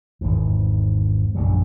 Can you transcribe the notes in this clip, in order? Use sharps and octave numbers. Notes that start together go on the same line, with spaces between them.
G#1 E2
A#1 F#2 C#3 F#3